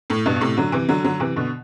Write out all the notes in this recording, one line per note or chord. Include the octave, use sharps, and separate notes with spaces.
A2
G2 B2
A2 C3
D3 F#3
C3 E3
D3 F#3
D3 F#3
C3 E3
B2 D3